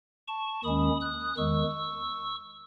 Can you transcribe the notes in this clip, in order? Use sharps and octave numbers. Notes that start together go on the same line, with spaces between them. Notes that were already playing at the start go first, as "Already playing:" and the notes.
A5 C#6
D#2 D#3 G#3 C#4 B5 D#6
D#6 F#6
E2 D#3 G#3 C#6 E6